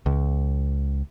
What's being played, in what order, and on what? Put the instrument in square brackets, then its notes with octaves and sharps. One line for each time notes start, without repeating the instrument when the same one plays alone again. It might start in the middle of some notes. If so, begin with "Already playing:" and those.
[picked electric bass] C#2